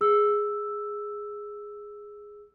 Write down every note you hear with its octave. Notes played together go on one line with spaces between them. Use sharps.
G#4 E6